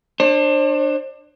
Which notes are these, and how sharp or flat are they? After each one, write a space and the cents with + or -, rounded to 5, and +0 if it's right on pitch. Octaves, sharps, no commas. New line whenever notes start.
D4 +25 C5 +40